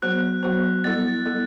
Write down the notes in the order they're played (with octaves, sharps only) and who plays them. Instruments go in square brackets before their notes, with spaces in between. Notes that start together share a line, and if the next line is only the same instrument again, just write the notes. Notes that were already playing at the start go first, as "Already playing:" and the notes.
[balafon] F#3 B3 F#4 C5 [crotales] F#6
[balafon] F#3 B3 F#4 C5
[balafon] G3 B3 E4 A4 [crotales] A6
[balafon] G3 B3 E4 A4